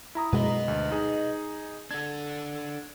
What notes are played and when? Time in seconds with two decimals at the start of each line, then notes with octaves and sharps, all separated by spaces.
0.15 E4 A#5 D#6
0.33 F#2 B2 G#3 B4 D#5
0.68 D2
0.91 D#4 G#4
1.91 D4 A4 G#6